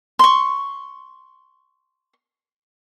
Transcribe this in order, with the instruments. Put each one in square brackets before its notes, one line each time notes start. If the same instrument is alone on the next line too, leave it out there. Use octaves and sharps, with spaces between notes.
[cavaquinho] C6 C#6